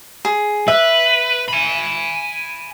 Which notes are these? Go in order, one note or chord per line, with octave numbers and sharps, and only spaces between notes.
G#4
B4 E5
G#5 B5